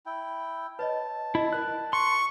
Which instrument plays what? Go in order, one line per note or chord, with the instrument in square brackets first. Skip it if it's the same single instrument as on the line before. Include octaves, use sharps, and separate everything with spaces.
[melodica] E4 G5
[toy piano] B4 C#5 D#5 [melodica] A5
[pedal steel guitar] E4 [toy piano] D#5
[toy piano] A#4 D5 [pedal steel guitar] F#6
[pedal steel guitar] C6 [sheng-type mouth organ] C#6